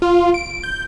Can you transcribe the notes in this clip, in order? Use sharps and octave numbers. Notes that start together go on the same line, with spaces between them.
F4
D7
G6